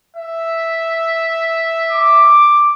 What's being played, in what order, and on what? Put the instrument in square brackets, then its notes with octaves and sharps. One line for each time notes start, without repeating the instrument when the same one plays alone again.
[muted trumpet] E5
[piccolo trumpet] D6